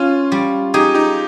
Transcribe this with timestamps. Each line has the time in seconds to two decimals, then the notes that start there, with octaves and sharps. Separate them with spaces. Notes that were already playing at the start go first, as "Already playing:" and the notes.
Already playing: C#4 F4
0.32 G3
0.74 D#4 G4 G#4
0.94 D#4 G4